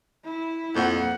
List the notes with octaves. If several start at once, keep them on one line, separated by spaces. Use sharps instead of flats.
E4
F2 A#3 F#5